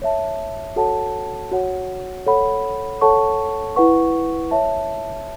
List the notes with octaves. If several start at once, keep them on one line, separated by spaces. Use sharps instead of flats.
C#5 E5 A5
F#4 A4 C#5 F#5 A5
F#4 C#5 F#5
A4 C#5 F#5 B5
A4 C#5 F#5 A5 C#6
E4 B4 F#5 C#6
C#5 E5 A5